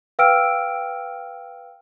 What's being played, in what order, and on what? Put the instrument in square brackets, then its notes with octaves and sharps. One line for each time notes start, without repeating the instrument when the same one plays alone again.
[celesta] B4 F5 G5 E6 F6 D7